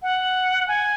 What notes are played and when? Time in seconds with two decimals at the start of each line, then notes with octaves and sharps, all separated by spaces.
0.03 F#5
0.68 G#5